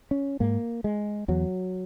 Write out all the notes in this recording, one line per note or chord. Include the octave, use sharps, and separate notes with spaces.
C#4
G#2 A#3
G#3
E2 F#3